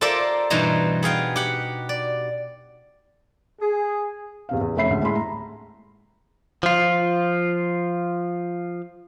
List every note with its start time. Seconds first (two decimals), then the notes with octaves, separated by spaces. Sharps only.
0.01 F4 A4 A#4 C5 D5 E5
0.50 G2 B2 E3 D#4 C5 A#5
1.03 B3 G#4 F5 G5
1.36 G4 F#5
1.89 D5
3.60 G#4
4.49 E2 C3 F5
4.61 E2
4.76 F1 A3 C#4 E5 B5 C7
4.90 D2 G#3
5.03 A2 G#3 A5 B5 C6
5.16 A#5
6.63 F3 F4